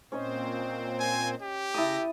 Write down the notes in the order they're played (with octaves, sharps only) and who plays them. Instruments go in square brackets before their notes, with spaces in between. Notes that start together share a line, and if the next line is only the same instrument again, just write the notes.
[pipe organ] A#2 C4 C5 [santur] C#4 C#5 D#5
[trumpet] G#5
G4
[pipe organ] C#3 A#6 [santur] E4 A5 D#6